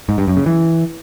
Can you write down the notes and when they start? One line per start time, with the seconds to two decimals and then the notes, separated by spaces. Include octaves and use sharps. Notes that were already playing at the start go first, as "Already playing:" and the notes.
0.09 G#2
0.18 G2
0.27 F#2
0.37 C#3
0.46 E3